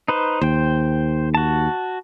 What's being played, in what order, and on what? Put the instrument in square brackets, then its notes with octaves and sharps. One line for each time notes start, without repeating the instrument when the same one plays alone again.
[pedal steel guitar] D#4 B4 C5
[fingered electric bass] D#2 [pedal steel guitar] C5 G5
[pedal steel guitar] F#4 A5